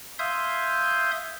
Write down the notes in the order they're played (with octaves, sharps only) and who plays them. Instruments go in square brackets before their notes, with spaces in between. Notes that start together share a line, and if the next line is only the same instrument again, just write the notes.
[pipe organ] E5 F5 C6 D#6 G6 G#6